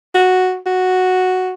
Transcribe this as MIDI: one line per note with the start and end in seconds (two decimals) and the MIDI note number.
0.15 0.58 66
0.66 1.53 66